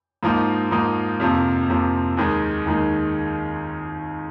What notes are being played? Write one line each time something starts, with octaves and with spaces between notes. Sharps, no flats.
G#2 F3 A#3 D#4
G#2 F3 A#3 D#4
F2 C3 F3 A#3
F2 C3 F3 A#3
D#2 D#3 G#3 D#4
D#2 D#3 G#3 D#4